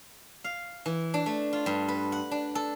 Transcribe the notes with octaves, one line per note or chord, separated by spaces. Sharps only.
F5
E3
D4
A3
F4
G2
B4
F#5
D4
A4